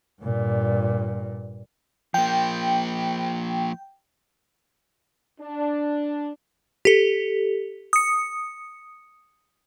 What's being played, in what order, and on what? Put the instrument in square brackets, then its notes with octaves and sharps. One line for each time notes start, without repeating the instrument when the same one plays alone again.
[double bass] G2 A#2
[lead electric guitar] F3 A#3 [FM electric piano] G5
[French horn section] D4
[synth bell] G4 A4
D#6 C#7